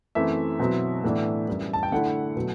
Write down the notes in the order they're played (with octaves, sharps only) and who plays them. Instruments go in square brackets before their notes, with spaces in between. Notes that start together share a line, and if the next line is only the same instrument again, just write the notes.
[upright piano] F#2 E3 A3 C4 E5
B2 F#3 C4 E4
A2 E3 B3 D4
F#2 E3 G3
A5
G5
D3 A3 E4 F#5
B2 F#3 A3